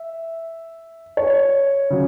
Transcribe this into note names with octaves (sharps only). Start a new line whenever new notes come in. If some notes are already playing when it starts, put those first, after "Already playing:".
Already playing: E5
C#5
C#3 F#3